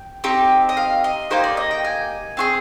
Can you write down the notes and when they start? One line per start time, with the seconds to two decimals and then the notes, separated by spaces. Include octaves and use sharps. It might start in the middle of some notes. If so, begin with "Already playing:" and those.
Already playing: G5
0.24 C4 D#4 G4
0.69 D#5
0.77 F5
1.04 D#5
1.31 A#3 D#4 G4 C5
1.44 D5
1.57 D#5
1.71 G5
1.84 G#5
2.37 C4 F4 G#4